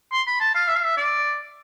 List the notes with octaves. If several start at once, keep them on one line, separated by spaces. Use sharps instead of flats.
C6
B5
A5
F5
E5
F5
E5
D5